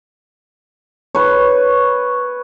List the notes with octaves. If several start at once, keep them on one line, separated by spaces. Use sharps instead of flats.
B4 C#5